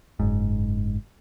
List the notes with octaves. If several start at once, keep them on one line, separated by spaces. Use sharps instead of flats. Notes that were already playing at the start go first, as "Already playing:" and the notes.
F#1 G#2